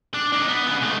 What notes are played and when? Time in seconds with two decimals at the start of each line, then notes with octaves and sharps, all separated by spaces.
0.14 D4
0.33 D4 D#4
0.48 B3
0.67 C#3 B3
0.81 G#2 A3